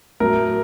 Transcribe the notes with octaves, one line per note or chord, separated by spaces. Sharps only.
A2 F#3 A#4